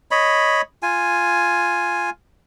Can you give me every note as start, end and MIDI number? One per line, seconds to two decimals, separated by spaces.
0.11 0.61 73
0.11 0.61 75
0.11 0.61 83
0.82 2.10 65
0.82 2.10 80